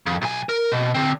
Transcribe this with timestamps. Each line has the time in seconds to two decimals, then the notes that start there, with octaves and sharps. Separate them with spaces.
0.06 F2
0.22 B1 G#5
0.49 A#4
0.72 B2
0.94 D3 C4